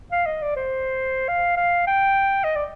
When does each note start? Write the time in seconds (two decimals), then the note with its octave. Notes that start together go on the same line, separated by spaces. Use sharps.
0.12 F5
0.26 D#5
0.42 D5
0.56 C5
1.28 F5
1.57 F5
1.87 G5
2.44 D#5
2.55 D5